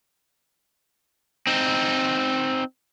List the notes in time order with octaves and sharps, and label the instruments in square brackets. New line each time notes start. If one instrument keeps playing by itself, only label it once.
[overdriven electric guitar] C4 D#4